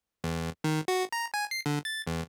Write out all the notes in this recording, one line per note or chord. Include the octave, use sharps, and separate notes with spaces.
E2
D#3
F#4
A#5
G#5
C7
D3
A6
E2